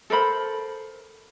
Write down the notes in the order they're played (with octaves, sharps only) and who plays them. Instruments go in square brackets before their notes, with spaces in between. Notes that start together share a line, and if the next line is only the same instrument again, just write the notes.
[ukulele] A4 A#4 C5 B5